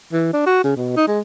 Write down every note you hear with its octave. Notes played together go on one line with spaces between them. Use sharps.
E3
D4
F#4
C#3
B2
D#4
G#3